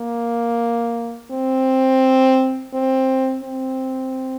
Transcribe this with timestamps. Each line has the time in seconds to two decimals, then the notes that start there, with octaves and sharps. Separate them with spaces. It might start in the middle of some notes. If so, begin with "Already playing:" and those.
Already playing: A#3
1.31 C4
2.74 C4
3.44 C4